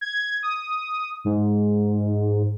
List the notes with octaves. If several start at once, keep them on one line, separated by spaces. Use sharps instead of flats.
G#6
D#6
G#2